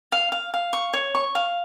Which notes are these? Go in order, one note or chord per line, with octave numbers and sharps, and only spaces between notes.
F5
F5
F5
C#6
C#5
C#6
F5